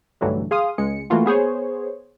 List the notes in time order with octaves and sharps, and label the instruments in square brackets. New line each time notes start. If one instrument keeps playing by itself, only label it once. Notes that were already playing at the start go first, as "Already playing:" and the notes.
[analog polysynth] B1 G2 D3 E3 F#3 A3
G#4 F5 C6 D#6
C#2 G#3 C#7
E3 A3 A#3 F4 F#4
B3 G#4 C5 C#5